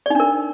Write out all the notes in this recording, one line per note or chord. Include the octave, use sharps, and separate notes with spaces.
D4 D#4 A#4 D5